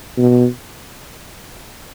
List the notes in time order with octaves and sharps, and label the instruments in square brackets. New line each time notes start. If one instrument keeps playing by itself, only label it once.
[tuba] B2